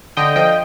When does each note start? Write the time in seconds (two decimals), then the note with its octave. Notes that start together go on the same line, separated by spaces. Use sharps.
0.17 D3 D#5 G5
0.36 F3 D#5 G5